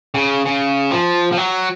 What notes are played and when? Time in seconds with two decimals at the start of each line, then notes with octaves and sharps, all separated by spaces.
0.14 C#3
0.46 C#3
0.91 F3
1.32 F3
1.37 F#3